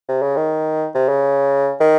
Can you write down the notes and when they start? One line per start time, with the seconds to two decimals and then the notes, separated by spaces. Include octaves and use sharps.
0.08 C3
0.22 C#3
0.37 D#3
0.95 C3
1.09 C#3
1.80 D#3